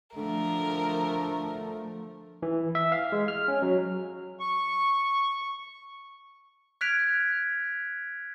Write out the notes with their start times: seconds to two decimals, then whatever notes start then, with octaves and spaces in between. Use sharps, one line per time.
0.16 D3 F3 A3 A#4
2.43 E3
2.75 E5
2.92 F5
3.12 G#3
3.28 F6
3.48 C#4
3.62 F#3
4.40 C#6
6.81 F6 F#6 G#6 B6 D7 F7